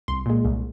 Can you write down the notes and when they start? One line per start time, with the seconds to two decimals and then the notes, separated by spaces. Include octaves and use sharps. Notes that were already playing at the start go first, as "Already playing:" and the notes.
0.08 C2 C6
0.26 A#2 G#3
0.45 C2